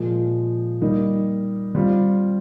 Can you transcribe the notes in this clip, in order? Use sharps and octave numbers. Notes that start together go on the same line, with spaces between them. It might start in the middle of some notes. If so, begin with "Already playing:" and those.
Already playing: A#2 F3 G#3
G3 A#3 D#4
G3 C4 F4